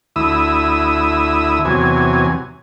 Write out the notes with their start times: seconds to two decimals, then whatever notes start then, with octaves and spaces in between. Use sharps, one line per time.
0.16 D2 E4 D#6 E6
1.65 E2 C3 F#3 G#5